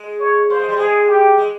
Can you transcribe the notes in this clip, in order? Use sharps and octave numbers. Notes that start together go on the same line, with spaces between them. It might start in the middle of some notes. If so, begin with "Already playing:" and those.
Already playing: G#3
C#5
A#3 C5
G#3
G3
G#3 G#4
G4
G#3